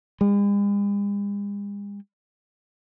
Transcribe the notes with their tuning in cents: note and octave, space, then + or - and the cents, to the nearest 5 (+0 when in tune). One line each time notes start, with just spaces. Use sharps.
G#3 -45